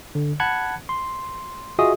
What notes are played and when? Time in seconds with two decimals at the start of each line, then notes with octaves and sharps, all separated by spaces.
0.15 D3
0.40 F#5 A5 B5 F#6 G#6 C#7
0.89 C6
1.79 F4 F#4 G#4 D#5 E5 D#6